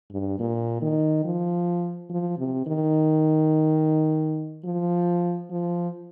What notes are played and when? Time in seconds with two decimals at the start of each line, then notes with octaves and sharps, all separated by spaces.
0.11 G2
0.40 A#2
0.82 D#3
1.25 F3
2.10 F3
2.38 C3
2.66 D#3
4.65 F3
5.50 F3